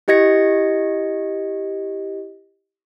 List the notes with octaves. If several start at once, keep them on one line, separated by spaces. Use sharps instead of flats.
E4 G4 D#5 G#6 A#6 C#7